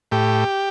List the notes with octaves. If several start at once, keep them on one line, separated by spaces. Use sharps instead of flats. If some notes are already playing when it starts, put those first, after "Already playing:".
A2 G4